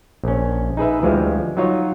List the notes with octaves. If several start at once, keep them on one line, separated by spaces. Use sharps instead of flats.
A#1 C#4
D#4 G#4 B4 E5
D2 E3 F3 G3 G#3 F5
F#3 D#4 F4 C#5 D#5